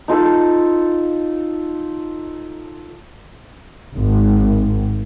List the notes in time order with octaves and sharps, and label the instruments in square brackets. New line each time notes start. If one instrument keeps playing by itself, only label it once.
[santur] D#4 F4 A4
[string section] G#1